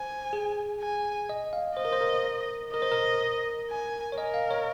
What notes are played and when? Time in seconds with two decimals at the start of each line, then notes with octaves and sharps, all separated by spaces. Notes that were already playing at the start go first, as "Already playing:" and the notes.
Already playing: C5 G#5
0.33 G#4
0.81 G#5
1.29 D#5
1.53 F5
1.77 C5 D#5
1.85 A#4
1.92 C5
2.01 A#4
2.73 A#4 D#5
2.82 C5
2.92 A#4
3.70 G#5
4.12 C#5
4.18 A#4 D#5
4.34 F5
4.51 C#5